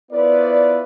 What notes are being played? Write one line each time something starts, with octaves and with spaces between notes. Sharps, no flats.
B3 E4 F4 B4 C5 D5